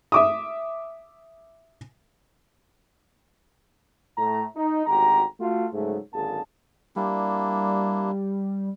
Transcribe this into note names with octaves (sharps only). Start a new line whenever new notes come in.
E5 D6 D#6
A2 A3 A#5
D#4
G#1 D2 F#4 G4 A#5
A3 F4 F#4
G#2 C#3 F#3 A3
G#1 F#2 D3 A#3 G#4 A5
G3 A#3 D4 E4